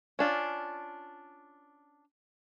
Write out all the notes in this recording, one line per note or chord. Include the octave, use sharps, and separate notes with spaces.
C#4 D4 F4